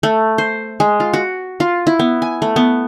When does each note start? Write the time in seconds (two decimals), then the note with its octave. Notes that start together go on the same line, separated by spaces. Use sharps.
0.03 A3
0.38 C5
0.80 G#3
1.00 F4
1.13 F#4
1.60 F4
1.87 E4
1.99 B3
2.22 G#5
2.42 A3
2.56 B3